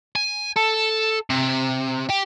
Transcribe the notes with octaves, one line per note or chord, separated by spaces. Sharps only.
G#5
A4
C3
G4